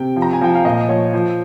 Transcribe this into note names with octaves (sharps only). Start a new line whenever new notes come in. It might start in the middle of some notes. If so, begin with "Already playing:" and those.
Already playing: C3 G5
F3
A#5
G#5
F3 G5
F5
A#2 D#5
F3 C#5
F3